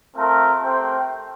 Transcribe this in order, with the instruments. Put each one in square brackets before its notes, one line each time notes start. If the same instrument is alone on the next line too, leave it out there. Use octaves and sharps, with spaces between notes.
[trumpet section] A3 C4 F4 A#4
A3 C4 G4 C5 G5